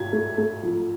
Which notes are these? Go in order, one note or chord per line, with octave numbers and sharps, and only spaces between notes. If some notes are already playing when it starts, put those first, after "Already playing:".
Already playing: G#6
A3
A3
F3